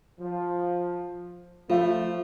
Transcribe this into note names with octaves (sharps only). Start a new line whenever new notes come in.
F3
F3 A3 F4 F5